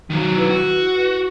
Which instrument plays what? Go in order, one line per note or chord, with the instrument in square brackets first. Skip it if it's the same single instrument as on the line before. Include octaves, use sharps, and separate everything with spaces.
[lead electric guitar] D#3 F#3
[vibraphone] E4 B4
[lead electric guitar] F#4